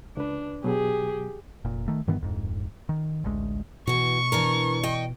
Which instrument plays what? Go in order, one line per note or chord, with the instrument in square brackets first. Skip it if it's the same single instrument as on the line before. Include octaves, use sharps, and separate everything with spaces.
[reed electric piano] C#2 B4 [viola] D4
[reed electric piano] B2 F#3 [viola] G4 G#4
[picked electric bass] F1 A#2
D#3 A3
G2 D#3 E3 B3
D1 F2 G#2
D#3
A1 D2 G#3
[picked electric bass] B2 [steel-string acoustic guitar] E3 F#4 [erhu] C#6
[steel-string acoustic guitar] E3 D4 A#4
D#5 G5